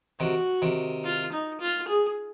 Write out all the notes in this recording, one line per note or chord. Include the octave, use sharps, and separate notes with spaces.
C3 D#3 F#4
C3 D#3
F4
D#4
F4
G#4